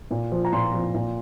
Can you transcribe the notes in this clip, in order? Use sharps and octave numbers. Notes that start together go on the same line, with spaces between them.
A#2
F3
A#5
A#2 C6
F3
A#2